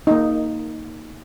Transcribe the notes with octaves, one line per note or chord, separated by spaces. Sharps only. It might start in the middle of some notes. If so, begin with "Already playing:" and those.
A#3 D#4